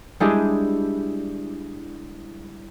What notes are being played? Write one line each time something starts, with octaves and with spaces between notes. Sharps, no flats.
G3 G#3 D4 E4 G4 G#4